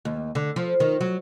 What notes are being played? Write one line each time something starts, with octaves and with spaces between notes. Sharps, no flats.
D#2
D3
F3
D#3
F#3